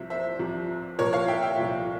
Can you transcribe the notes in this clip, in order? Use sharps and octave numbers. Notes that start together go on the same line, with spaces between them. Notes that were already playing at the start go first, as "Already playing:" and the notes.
Already playing: C2 C3 F3 E5
C5 E5
C2 C3 F3
C2 A#2 F3 A#4 C#5
C#5 F5
E5 G5
E5 G5
C2 A#2 F3